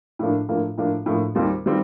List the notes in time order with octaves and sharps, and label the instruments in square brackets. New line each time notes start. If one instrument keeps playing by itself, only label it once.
[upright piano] A2 F3 A#3 D4
A2 F3 A#3 D4
A2 F3 A#3 D4
A2 F3 A#3 D4
D#2 D#3 G3 C4 F4
D#3 G3 C4 F4